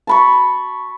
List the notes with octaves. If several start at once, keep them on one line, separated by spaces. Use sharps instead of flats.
A5 B5 C#6